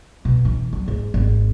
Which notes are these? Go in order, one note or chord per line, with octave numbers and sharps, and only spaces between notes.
B2
E3
F#3
G#2
G#1